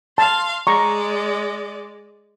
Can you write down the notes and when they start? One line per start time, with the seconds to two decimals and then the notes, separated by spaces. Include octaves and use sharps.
0.18 F5 A5 C6
0.67 G#3 D5 A#5 C#6